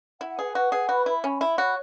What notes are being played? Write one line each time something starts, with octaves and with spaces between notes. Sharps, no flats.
E4 F#5
G#4 B4
F#4 F#5
G#4 B4
F#4 B5
E4 B5
C#4 B5
E4 B5
F#4 C#5